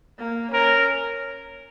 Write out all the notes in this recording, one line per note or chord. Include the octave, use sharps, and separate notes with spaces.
A#3
C#4 A#4